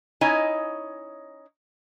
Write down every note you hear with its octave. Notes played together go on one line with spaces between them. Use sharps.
C#4 D#4 E4 C#5 D#5 G#5